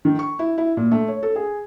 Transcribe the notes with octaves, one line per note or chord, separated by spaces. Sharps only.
D#3
C#6
E4
E4
A#2
A3
C#5
A4
G#4